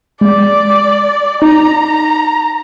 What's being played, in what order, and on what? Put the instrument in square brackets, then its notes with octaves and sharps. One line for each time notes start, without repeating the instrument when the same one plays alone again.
[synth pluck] G#3 [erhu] D5
[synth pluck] D#4 [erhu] A#5